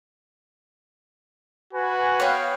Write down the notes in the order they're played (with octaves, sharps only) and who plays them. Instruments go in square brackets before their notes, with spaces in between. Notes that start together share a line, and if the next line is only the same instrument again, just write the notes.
[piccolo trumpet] F#4 [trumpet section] B4 G#5
[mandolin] B3 C#5 [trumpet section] F5 G5